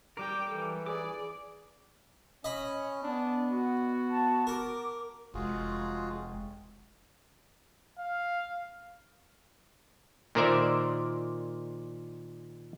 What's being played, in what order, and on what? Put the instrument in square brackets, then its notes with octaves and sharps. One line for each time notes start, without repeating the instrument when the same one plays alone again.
[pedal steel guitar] G3 A#4 [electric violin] G5 D6
[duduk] E3 [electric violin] A4
[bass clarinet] G#4 [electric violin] D5 [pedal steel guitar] D6
[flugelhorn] C#4 [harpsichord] D#5 B5
[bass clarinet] B3 [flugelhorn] D4
[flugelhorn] F#4
[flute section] A5
[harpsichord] A#4 [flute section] D6
[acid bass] F1 [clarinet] G#3 [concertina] F4 F#4 G#4
[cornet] F5
[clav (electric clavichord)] A#2 D#3 A#4 C5 D5 E5